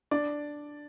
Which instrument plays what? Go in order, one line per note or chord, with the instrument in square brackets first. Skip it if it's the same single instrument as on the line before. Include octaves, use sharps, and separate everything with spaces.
[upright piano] D4 D5